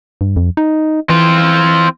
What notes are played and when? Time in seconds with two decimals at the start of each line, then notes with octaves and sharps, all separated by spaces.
0.21 G2
0.36 F2
0.57 D#4
1.10 E3 C4 F4